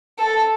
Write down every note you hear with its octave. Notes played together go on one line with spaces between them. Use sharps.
A4